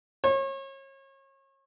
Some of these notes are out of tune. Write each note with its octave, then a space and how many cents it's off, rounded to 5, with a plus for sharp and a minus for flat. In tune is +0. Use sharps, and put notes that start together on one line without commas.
C#5 -35